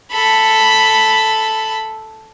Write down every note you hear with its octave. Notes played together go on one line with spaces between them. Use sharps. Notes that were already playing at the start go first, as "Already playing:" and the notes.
A4 B5